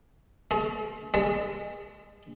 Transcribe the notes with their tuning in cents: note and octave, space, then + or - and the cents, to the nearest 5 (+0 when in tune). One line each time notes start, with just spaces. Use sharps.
G#3 +40
G#3 -25